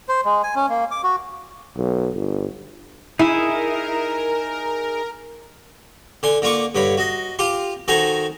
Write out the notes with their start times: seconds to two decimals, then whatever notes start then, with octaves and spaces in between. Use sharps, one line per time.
0.09 C5
0.25 G#3
0.43 G#5
0.55 C#4
0.69 A#3
0.91 D6
1.03 F#4
1.77 B1
2.13 G1
3.19 D#4 E4 G#4 A#4 E5
6.23 D3 G#5 C6
6.42 D3 A#3 F4 C#6 D6
6.75 G2 D3 C#5 B5
6.97 F#4 D#5
7.39 F4 G4 C6
7.88 D#3 F#4 A4 C5 G#5 A#5